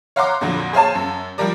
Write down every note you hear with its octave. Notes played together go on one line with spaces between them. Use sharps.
C#5 F5 F#5 A#5 C6 D6
F2 A#2 D3 F3 F#3
G#4 C5 C#5 F5 G#5 A5
F#2
F3 G3 G4 A#4 D5